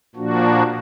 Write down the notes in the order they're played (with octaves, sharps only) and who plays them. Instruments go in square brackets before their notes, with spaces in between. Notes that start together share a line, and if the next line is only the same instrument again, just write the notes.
[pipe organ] A#2 F3 A#3 D4 F#4